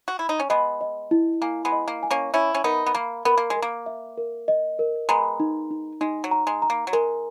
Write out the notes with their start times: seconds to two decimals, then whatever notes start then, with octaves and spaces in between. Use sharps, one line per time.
0.08 F#4
0.19 E4
0.29 D#4
0.40 C#4
0.50 G#3 B3 D#5
0.81 D#5
1.11 E4
1.42 A#3 G#5
1.65 G#3 B3
1.72 D#5
1.88 A#3
2.03 G#5
2.11 A#3 C#4
2.34 C#4 E4 E5
2.55 C#4
2.64 B3 D#4 A#4
2.86 B3
2.95 A#3 B5
3.25 B3 A#4
3.37 A#3
3.50 G#3
3.56 A#4
3.62 A#3
3.86 E5
4.18 A#4
4.48 D#5
4.79 A#4
5.09 G#3 B3 A#5
5.40 D#4
5.71 D#4
6.01 G#3 D#4
6.24 F#3
6.31 A#5
6.47 G#3
6.62 A#5
6.70 A#3
6.87 F#3
6.93 G#3 A#4